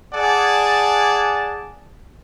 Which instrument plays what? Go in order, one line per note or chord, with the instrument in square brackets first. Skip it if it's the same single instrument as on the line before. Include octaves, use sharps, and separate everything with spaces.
[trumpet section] G#4 D5 F#5 G#5 A5